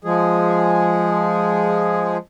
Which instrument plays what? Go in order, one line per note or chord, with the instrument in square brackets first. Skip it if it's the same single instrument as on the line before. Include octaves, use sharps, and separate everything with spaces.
[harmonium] F3 G#3 G#4